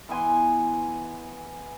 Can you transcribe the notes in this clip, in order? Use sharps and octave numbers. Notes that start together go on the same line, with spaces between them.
E3 B3 G#5 C6